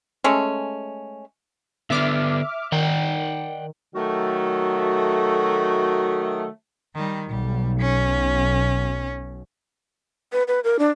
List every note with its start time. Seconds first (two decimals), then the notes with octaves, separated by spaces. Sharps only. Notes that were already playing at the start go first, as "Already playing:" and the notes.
0.24 G#3 A3 C#4
1.90 D3 B3 D4 E5 D6 F6
2.72 D#3 D5 F#5 G5
3.95 D#3 F#3 A3 F#4
6.95 D#3 G3
7.30 B1 G3
7.80 C#4
10.33 B4
10.48 B4
10.64 A#4
10.79 D4